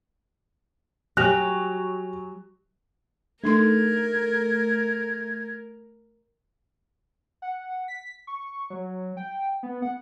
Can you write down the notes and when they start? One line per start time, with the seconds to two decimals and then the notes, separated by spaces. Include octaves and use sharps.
1.17 F#3 G4 G#5 F#6 A#6 F7
3.44 A3 D4 D#4 A#4 C6 G#6
7.42 F#5
7.88 B6
8.27 C#6
8.70 F#3
9.17 G5
9.63 B3
9.82 F#5